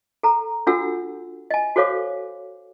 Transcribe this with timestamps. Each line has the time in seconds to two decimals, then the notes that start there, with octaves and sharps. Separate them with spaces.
0.23 A4 A#5
0.67 D4 F4 F#4 A4 F#5 E6
1.51 D#5 G#5
1.76 F#4 A4 C5 C#5 F5 D6